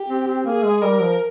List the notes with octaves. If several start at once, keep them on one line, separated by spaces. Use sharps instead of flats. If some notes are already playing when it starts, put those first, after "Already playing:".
Already playing: G4
C4
C4
A#3 G#4
G#3
G3 A#4
F3